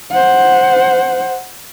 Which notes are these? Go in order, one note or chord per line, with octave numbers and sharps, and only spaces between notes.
C5 F#5